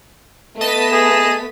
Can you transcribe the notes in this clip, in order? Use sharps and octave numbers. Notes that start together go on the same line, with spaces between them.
A3 B3 D#5 A5 B6 D#7
G#4